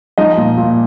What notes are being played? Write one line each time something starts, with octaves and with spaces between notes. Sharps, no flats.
F3 D#4 D#5
A#2
A#2